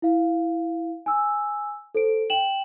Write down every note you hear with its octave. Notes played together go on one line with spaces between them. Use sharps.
E4 F5
G#5 E6
A4 C5 D7
G5 E7 F#7